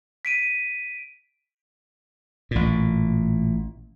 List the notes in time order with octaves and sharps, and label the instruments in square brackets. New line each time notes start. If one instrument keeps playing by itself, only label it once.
[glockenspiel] B6 D7 D#7
[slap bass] A1 A#2